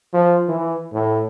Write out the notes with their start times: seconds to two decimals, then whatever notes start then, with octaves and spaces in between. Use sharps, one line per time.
0.13 F3
0.49 E3
0.92 A2